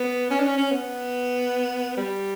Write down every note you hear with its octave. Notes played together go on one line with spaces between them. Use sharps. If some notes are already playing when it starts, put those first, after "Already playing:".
Already playing: B3
C#4
D4
C#4
C#4
B3
G3